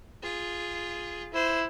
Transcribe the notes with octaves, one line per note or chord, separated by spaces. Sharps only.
F4 G#4
E4 C5